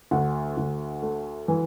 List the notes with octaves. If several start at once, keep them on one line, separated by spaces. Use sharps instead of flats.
D2 F#5
D2
A3
E3